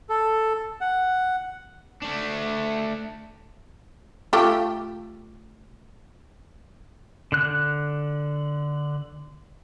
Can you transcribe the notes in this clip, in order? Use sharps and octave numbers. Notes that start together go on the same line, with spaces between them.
A4
F#5
A3 D4
A3 F4 G4
D3 F#6